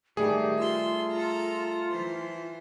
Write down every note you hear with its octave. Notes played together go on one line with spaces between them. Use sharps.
D#3 G3 A3 G4 G#4
F4 C6 E6
A4 A#5
E3 C5